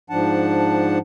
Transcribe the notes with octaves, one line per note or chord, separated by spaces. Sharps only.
G#2 F3 D4 F#5 A5